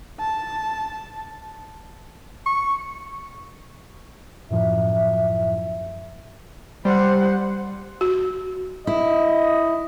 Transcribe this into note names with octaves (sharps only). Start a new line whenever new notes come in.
A5
C#6
F#2 A2 F3 E5
G3 C5 F#5
F#4
E4 D#5